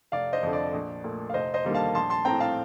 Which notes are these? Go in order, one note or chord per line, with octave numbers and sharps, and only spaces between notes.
F1 D5 F5
C5 D#5
F2 D3
D5
A#1
A#2 A3
F5
F1 C5 D#5
C5 D#5
D#2 D3 G3 A#3
F5 A5
A#1 A5 C6
A5 C6
A2 A3 C4 G5 A#5
F5 A5